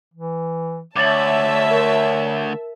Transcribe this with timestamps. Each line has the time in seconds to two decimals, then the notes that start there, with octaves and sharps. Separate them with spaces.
0.14 E3
0.96 D2 C#5 E5 A5 D6 A6 F#7
1.71 A#4